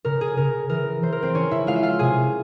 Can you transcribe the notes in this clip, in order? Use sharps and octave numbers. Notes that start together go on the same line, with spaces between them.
C#3 A#4
G#4
C#3 A#4
E3 A#4
E3 C5
A#4
C4 C5
E3 C#4 C#5
E4 E5
G#3 F4 F5
E5
F4 F5
C3 G#4 G#5